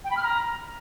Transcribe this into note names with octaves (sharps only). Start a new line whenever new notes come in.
G5
B5
F6
A#5